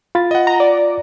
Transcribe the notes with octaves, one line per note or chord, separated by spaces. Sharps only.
F4 B5 A6
D#5 F#5
A#5
D5